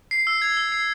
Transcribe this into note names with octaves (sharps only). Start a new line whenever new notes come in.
C7
E6
G#6
E6
C7